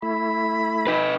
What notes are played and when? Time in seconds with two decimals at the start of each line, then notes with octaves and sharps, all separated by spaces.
0.02 A3 E4 B5
0.87 D#4 B4